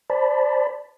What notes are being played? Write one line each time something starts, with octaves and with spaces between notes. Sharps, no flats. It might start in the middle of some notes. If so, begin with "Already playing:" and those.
C5 D5 A5 B5